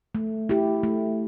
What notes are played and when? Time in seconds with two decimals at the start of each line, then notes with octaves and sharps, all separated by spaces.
0.15 A3
0.49 E4 G4
0.83 A3